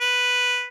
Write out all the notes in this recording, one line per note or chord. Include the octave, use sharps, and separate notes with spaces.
B4